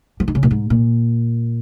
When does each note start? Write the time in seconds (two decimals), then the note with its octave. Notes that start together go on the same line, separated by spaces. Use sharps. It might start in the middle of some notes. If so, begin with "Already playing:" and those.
0.20 F3
0.28 D#3
0.35 C#3
0.43 A#2
0.51 G#2
0.70 A#2